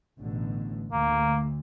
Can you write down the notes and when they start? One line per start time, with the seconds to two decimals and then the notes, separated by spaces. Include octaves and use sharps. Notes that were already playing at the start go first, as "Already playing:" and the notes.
0.19 A1 B2 D3
0.92 D2 A#3